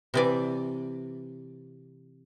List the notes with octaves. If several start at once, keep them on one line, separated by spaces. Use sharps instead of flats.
C3 E3 D5